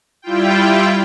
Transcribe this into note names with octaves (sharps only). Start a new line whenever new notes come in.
G3 E4 F4 G5